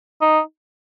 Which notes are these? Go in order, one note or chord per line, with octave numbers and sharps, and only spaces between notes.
D#4